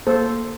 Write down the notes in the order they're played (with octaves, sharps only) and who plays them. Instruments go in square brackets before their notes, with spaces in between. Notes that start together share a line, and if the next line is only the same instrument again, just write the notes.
[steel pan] A#3 A4 C5